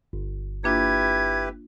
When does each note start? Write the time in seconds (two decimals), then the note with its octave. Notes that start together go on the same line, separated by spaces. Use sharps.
0.13 G1
0.64 A#3 D4 E4 F4 G4 B4 G#6